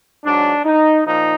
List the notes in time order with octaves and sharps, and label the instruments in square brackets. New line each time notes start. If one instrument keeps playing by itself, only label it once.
[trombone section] G#2 F#3 D4
D#4
A#2 F3 D#4